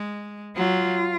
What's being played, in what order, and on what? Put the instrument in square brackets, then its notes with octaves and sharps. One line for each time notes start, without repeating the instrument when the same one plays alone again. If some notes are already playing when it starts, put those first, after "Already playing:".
Already playing: [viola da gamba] G#3
[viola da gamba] F#3 [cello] F4